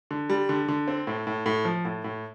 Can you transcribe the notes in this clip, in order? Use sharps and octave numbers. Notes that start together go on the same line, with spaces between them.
D3
G3
D3
D3
C4
A2
A2
A2
F3
A2
A2